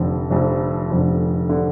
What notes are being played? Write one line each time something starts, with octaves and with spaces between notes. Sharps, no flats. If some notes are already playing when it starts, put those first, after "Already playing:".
Already playing: F1 F2 D3
F1 F2 D3
F1 F2 D3
D3